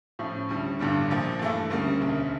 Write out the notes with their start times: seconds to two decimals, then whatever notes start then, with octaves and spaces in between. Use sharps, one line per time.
0.19 A2 F3 C#4 E4
0.49 D2 C#3 G3 C#4
0.79 A1 G2 D3 G3 D4
1.10 A#1 A#2 F3
1.40 G2 E3 A3 E4
1.70 D2 C#3 G3 A#3 C#4
2.00 E1 D2 C#3